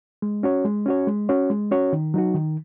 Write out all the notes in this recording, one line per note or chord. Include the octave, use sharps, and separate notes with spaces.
G#3
C#4 F#4 C#5
G#3
C#4 F#4 C#5
G#3
C#4 F#4 C#5
G#3
C#4 F#4 C#5
D#3
F#3 D#4 F#4
D#3